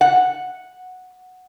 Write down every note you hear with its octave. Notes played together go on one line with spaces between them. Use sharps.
F#5